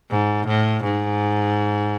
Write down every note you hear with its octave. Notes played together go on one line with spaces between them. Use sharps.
G#2
A2
G#2